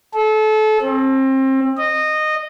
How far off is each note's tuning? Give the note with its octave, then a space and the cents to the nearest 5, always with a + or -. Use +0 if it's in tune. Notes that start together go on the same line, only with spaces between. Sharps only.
A4 -30
C4 +30
D#5 -15